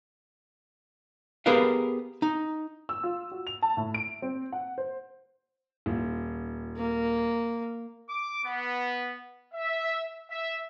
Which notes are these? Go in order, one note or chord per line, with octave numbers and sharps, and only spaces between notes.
B3 G4 G#4 A#4 B4 F5
D#4
E6
F4
F#4
F7
A5
A2
D7
C4
F#5
C5
D#1 F4
A#3
D6
B3
E5
E5